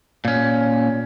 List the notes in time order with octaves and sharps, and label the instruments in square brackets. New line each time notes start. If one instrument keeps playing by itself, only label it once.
[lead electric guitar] A#2 C#4